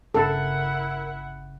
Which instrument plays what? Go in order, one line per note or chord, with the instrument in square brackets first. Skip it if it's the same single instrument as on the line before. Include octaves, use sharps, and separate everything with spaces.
[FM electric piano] G1 C#3 [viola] E4 F#5 [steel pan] A4 [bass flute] A#4